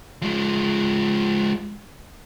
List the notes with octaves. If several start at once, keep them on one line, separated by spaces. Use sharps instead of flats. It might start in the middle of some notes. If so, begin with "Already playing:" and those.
F3 G#3